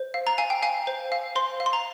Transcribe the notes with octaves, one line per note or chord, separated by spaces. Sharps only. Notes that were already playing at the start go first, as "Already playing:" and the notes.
Already playing: C5
F5
A#5
F5 G#5
G5
F5 G#5
C5
F5
C5 C6
F5
C6
A#5